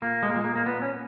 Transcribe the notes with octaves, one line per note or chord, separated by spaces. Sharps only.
A#2 A#3
G#3
A#3
A#2 G#3
A#3
A#3
A#2 B3
C#4